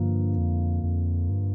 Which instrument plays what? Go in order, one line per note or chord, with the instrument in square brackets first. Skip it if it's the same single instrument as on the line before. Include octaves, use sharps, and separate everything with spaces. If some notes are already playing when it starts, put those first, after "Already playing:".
Already playing: [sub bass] G2 [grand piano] D3 F3 A#3
[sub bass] F2
F2
G2